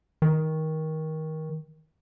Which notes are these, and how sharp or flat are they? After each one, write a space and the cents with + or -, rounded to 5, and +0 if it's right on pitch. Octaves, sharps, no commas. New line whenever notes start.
D#3 +20